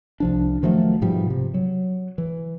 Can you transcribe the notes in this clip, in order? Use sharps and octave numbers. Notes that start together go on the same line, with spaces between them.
C2 F3 D4
D#3 F3 F#3 A3
G#2 B2 F3 G3
C3
F#3
E3